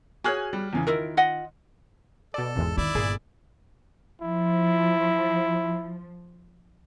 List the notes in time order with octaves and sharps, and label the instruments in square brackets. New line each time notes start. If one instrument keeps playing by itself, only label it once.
[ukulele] F#4 G#4 C#5 [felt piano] G#5 F6 F#6
[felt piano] G3
E2 C#3 E3
[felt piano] D#3 [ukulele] E4 F4 A#4
[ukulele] F4 D#5 F#5
[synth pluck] B2 D5 [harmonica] A4
[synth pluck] G#1 E2 G#3
[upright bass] D#3 [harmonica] E4 D5
[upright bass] G1 [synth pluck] A#2 G#4
[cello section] F3 [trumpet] E4